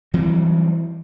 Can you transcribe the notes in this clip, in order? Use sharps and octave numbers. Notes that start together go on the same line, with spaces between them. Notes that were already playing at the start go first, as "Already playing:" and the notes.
E3 F#3 G3 C4